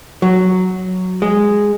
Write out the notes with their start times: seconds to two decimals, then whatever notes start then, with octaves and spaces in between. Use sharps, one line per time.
0.22 F#3
1.22 G#3